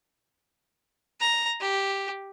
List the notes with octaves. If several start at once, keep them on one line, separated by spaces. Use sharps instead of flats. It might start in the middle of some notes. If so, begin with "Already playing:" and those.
A#5
G4